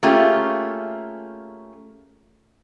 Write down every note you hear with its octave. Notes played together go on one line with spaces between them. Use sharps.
A3 A#3 C#4 F4 G4 G#4